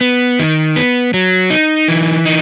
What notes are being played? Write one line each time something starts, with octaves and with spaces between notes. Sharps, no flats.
B3
D#3
B3
F#3
D#4
E3
D#4